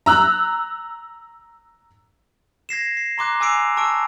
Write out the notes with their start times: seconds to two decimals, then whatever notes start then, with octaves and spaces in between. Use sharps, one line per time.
0.06 A#5 E6 F#6
2.69 G#6 A#6 C7 E7
2.97 C7
3.18 A#5 C6 D6 F#6
3.40 G#5 D6 E6 C7 D7 F7
3.77 A5 C#6 E6 D7